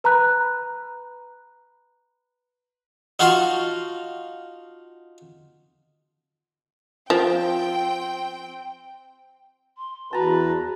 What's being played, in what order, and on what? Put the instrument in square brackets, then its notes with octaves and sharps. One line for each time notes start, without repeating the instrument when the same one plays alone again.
[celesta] B4 A#5 B5 F#6
[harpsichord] D#4 F4 F#4 F5 A5
[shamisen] F3 [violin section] C4 G5
[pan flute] C6
[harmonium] E2 B4 [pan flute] F#4 [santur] A5 A#5